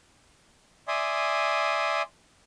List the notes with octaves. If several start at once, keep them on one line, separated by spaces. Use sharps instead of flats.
D5 E5 G#5 C6 D#6